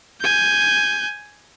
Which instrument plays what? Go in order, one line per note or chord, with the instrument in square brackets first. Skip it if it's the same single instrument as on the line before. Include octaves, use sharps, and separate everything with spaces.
[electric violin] G#5 G6